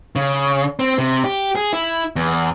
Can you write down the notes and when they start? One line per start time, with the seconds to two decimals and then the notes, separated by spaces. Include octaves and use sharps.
0.16 C#3
0.79 C4
0.98 C3
1.25 G4
1.55 G#4
1.73 E4
2.16 E2